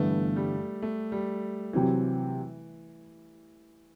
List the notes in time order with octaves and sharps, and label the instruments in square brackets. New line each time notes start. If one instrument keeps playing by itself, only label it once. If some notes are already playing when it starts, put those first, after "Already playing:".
Already playing: [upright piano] G1 G2 E3 B3 [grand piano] A3
[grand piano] G3
A3
G3
[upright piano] C3 F#3 C4 [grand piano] E3